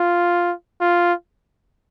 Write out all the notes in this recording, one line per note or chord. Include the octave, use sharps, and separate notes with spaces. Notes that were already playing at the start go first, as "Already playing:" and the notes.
Already playing: F4
F4